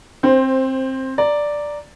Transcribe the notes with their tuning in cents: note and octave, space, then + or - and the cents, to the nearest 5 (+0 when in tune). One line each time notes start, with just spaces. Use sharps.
C4 +15 C5 +0
D5 +0 A#5 -5